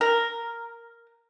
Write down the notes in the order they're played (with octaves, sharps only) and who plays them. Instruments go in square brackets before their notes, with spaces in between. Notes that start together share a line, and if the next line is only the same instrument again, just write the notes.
[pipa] A#4